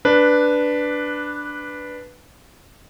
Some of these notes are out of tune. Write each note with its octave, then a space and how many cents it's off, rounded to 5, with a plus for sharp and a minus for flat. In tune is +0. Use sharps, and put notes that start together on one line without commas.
D4 +0 B4 +0